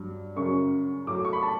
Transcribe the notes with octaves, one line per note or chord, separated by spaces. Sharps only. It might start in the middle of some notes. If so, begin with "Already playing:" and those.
Already playing: G2 F#3
F#2 C#3 F#3 C#6
A2 F#3 D6
C#6
B5
A5